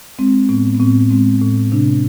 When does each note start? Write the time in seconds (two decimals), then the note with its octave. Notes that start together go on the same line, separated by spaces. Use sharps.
0.19 G#3 C4
0.49 A2 B3
0.75 B3
0.80 A2 C4
1.10 G#3 C4
1.41 A2
1.72 C3 D4